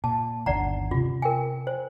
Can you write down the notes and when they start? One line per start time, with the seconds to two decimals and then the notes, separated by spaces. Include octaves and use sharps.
0.04 A#2 A5
0.46 G1 D#2 D3 D5 F#5 A#5
0.91 C3 C#4 F4
1.22 A#4 G5 G#5
1.67 C5